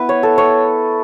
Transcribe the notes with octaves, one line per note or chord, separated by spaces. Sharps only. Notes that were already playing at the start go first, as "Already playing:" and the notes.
Already playing: B3 E4 B4 E5
C#5
A4
C#5